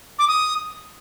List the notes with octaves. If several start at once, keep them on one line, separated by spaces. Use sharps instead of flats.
D6
D#6